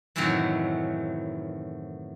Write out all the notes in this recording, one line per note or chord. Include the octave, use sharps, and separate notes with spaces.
F#2 A2 C3 D#3 E3 F#3